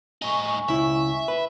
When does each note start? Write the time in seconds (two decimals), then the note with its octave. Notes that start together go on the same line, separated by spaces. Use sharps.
0.22 A2 D#4 G#5 C#6
0.68 C#2 E4 E5
1.28 B4